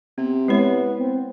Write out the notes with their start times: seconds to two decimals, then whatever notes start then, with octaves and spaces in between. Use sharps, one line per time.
0.18 C3 B3
0.48 G#3 B3 E4 C#5
1.00 C4